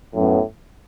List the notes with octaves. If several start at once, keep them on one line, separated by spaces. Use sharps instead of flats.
F#2 A2 F#3 B3